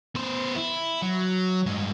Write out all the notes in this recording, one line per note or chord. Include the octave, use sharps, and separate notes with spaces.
B3 C5
E4
F#3
G2 G#3